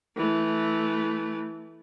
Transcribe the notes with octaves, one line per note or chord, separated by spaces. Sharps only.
E3 A3